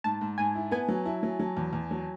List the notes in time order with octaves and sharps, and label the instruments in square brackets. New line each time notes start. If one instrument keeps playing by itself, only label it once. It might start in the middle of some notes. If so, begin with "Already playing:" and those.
[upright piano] G#2 [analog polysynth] A5
[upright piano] G#2
[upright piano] G#2 [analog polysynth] G#5
[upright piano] E4
[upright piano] B3 [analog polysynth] G#5
[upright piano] F#3
E4
F#3
F#3
E2
E2
F#3